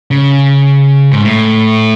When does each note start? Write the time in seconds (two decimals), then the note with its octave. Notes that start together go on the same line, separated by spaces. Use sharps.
0.11 C#3
1.11 G#2
1.22 A2